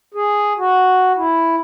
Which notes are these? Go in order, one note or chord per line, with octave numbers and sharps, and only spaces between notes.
G#4
F#4
E4